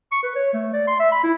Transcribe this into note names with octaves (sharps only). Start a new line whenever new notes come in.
C#6
B4
C#5
A3
D5
C6
E5
B5
E4